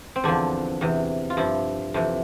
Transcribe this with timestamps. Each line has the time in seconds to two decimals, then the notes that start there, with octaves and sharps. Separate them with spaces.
0.16 C4
0.24 E2 D3 F3 D4
0.81 E2 C3 E3
1.30 F4
1.37 G2 F3 E4
1.94 F2 C3 E3